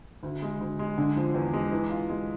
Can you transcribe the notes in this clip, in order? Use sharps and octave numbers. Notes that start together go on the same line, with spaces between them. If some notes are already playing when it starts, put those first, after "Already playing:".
D2
G#3
D2
G#3
D3
F3
E2
G#3
E3
F4
G#3